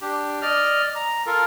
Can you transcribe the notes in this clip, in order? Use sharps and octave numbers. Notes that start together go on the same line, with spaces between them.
D4 G4
D5 D#5 F6
A#5
F4 A4 A#4